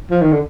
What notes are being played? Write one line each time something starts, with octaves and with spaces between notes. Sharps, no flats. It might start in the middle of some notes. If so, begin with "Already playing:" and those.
F3
D#3
D3